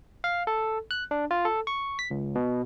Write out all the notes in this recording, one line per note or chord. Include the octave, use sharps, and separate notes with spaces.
F5
A4
F#6
D4
F4
A4
C#6
B6
C#2
B2